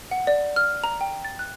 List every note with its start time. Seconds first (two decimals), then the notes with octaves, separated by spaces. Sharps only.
0.11 F#5
0.27 D5
0.56 F6
0.84 A#5
1.01 G5
1.25 A6
1.39 F#6